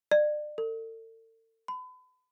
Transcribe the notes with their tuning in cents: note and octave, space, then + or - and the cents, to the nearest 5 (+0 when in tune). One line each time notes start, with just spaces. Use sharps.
D5 +35
A4 +40
B5 +35